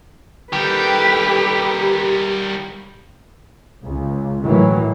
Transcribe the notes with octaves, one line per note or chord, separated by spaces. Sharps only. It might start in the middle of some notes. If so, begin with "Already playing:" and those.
D#3 G3 G4 A4 B4
C#2
A2 D#3 E3 F#3